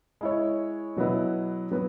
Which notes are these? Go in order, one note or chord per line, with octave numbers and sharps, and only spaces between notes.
G#3 E4 C#5
B2 F#3 B3 E4
F#3 B3